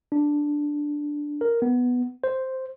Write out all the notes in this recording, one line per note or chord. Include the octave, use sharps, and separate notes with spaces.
D4
A#4
B3
C5